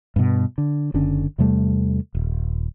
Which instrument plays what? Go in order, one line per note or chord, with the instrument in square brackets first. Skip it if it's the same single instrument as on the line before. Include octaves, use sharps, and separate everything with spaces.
[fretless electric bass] G2 B2
D3
F#1 D3 C#4
E2 C3 G3 A3
D#1